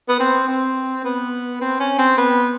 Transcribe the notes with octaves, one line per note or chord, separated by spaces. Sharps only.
B3
C4
C4
B3
C4
C#4
C4
B3